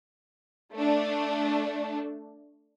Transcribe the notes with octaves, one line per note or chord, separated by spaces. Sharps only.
A3 D4